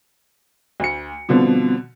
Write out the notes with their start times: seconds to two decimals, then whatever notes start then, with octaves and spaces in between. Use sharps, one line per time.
0.80 D2 C#7
1.29 B2 D3 F3 G3 B3 C4